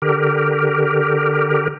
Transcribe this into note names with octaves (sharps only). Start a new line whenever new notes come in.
D3 G4 A#4